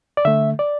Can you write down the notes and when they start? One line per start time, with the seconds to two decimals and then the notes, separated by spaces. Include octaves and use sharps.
0.17 D5
0.25 D3 A3 E5
0.59 D5